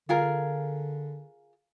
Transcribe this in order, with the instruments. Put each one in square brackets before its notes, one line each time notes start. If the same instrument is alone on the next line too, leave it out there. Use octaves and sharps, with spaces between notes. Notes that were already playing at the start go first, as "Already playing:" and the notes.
[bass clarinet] D3 [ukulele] F4 G#4 A#4